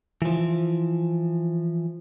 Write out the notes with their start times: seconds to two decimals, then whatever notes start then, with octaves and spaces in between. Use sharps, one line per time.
0.22 E3 F3